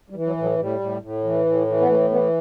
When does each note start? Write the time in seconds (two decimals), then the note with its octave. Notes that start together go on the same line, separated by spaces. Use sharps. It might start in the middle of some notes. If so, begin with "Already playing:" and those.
0.10 G3
0.15 E3
0.27 F#3
0.37 A2
0.42 F#3
0.58 A2 G3
0.80 A2
1.02 A2
1.24 E3
1.46 A2
1.67 E3
1.81 B3
1.88 A2 A3
2.10 E3 B3